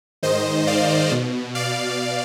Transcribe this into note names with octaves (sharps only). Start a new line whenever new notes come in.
G#2 D#3 C5 D#5
D5 F5
B2
D5 F5